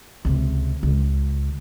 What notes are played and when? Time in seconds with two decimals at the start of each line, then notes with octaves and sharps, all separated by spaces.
0.25 C#2 C3
0.83 C#2